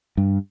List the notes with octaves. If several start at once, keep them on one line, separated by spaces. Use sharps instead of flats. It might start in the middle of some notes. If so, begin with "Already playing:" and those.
G2